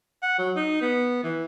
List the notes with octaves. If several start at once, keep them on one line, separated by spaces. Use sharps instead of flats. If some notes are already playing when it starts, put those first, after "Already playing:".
F#5
F#3
D#4
B3
E3